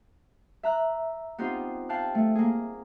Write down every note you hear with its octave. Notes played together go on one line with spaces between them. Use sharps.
E5 A#5 F#6
B3 C4 D#4 F4 G4 C5
F5 G5 A5 F#6
A3
A#3 G#4